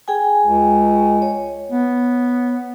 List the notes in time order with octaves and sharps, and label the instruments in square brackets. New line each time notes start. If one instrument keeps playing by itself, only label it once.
[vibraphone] G#4 G5 G#5
[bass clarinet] C#2
[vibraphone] C#5
[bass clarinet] B3